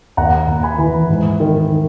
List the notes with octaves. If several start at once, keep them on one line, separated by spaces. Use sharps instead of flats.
D#2 F#5 A#5
D#2
G#5 B5
E3
G#2
D#3